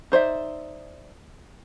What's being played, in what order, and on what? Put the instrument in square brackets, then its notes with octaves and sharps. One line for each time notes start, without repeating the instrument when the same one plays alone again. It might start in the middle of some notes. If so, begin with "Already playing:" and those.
[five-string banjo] D#4 C5 D5 E5